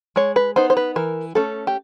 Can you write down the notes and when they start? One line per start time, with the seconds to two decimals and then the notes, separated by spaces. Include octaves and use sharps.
0.16 G#3 C#5
0.36 B4
0.56 B3 D#4 C5
0.70 C5
0.77 B4
0.96 E3 A#4
1.35 A3 C#4 A4
1.67 G4